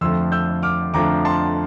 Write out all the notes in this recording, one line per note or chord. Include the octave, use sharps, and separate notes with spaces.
F2 D3 F3 A3 C6 E6
E6 G6
D6 F6
F2 D3 F3 A3 A#5 D6
A5 C6